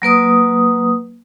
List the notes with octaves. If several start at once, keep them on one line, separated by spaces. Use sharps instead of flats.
F#3 A#3 B4 D#6